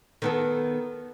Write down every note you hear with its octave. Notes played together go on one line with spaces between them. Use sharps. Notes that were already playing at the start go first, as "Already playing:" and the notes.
D#3 B3 A4